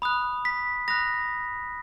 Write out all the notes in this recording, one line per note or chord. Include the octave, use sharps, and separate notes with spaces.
B5 D#6 F#6
B6
B5 D#6 F#6 A#6